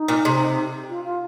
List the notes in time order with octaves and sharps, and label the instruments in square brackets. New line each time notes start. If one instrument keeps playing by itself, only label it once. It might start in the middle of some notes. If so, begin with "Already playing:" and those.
Already playing: [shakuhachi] D#4
[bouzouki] A#2
C3
[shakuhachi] F4
F4